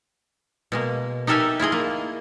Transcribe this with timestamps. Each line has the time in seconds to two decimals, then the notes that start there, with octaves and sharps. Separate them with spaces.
0.72 B2 G#3 A#3
1.27 D#4 G4 A4 A#4 E5 G#5
1.60 E4 F4 G#4 D#5
1.72 A#3